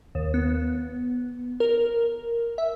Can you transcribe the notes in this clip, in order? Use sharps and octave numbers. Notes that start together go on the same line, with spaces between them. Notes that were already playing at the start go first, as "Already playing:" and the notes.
D#2
B3
A#4
E5